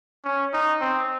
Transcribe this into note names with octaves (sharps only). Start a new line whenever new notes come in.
C#4
D#4
C4